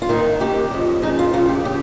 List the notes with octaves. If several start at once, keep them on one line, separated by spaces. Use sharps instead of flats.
F4
D#2 D#3 D#4
D#2 D#3 G4
F2 C#3
F2 C#3 D#4
F4
F2 C#3 F4
G4
C#3 G4